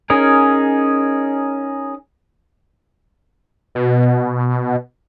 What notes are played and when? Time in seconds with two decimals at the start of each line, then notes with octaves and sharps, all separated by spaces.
0.10 C#4 D#4 G#4 A#4
3.75 B2